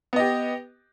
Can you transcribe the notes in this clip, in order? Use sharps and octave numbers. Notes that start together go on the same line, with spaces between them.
B3 G4 D#5